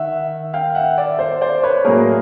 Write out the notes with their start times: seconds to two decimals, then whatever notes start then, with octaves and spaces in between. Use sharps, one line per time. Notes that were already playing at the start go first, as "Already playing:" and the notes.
Already playing: D#3 E5 F#5
0.54 F5 G5
0.75 E5 F#5
0.98 D5 E5
1.19 C5 D5
1.41 C5 D5
1.63 B4 C#5
1.84 A2 F#3 A#3 C#4 G#4 A#4